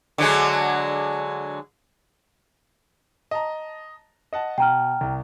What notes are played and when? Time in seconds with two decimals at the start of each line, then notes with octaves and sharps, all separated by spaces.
0.18 D3 F#3 G#3
3.31 D#5 A5 A#5
4.33 D#5 F#5 A5
4.58 B2 G5 A#5 F6
5.01 C2